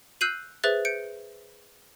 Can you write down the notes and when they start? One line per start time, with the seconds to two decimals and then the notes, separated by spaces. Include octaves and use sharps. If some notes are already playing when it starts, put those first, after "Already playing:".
0.21 E6 F#6 G6 C7 D#7 F#7
0.64 G#4 B4 C5 E5 F#6 A6
0.85 G6 C#7 D7